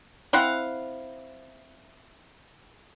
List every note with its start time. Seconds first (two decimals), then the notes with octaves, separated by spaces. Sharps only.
0.33 C4 E4 F5 F#5